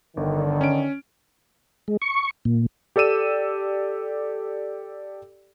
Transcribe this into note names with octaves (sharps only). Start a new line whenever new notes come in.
G1 D3 D#3
C#4 D7
G#3
C#6
A#2
G4 A4 D5 E6 D#7 E7